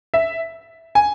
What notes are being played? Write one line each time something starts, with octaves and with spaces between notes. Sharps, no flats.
E5
G#5